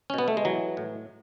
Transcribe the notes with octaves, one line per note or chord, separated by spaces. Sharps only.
C#4
B2 B3
A3
G#3
E3 F#3
A2